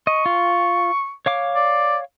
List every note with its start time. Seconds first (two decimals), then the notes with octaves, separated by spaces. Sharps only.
0.07 D#5 C#6
0.26 F4
1.26 C#5 F5 D6
1.55 D5